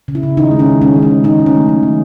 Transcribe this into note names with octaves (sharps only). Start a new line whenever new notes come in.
C#3
E4
C#3
D#3 D#4
G#3
C#4
D#3
G#3 C#4
D#3
C#4
G#3
D#3 D#4
D#3
C#4
A3
F#3
D#3